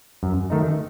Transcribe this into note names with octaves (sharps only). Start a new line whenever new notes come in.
F#2
D#3 A3 D#4